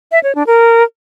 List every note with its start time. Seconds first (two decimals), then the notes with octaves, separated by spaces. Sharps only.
0.12 E5
0.23 C#5
0.35 D4
0.47 A#4